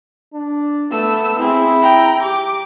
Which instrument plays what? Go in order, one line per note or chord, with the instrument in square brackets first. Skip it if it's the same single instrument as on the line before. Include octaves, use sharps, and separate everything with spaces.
[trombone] D4
[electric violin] A3 E6 [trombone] B3
[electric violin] C4 G#4 [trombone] E4
[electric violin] G5 A#5
[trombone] G4 [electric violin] D6